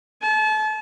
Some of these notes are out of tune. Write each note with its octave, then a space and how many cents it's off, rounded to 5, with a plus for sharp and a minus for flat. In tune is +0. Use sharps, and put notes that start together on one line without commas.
A5 -35